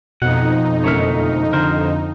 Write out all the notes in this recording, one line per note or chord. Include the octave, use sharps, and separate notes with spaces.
F2 B2 D#4 F#5
F#1 D2 A3 A#4 C#5 F6
D3 A#4 C5